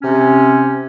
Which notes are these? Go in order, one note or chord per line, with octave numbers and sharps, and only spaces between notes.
C3 C#4